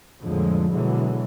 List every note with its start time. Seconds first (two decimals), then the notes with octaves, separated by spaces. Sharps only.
0.23 A#1 F2 A2 D3 F3 G#3
0.74 B2 D3 E3 F#3 G#3